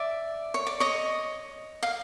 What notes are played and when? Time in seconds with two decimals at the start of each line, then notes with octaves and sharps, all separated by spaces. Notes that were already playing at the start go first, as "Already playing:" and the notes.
Already playing: D5 E5
0.54 C#5
0.67 D5
0.80 C#5 D#5
1.83 F5